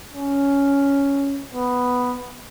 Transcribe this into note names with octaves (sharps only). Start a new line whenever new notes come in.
C#4
B3